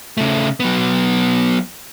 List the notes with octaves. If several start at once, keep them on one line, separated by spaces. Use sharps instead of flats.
C#3 A3
F#3 B3